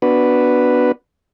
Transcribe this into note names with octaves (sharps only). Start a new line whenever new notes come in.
B3 D4 F#4 B4